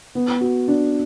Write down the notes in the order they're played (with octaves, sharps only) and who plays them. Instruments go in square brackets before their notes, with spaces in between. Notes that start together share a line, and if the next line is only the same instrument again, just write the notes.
[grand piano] B3
F#4
D4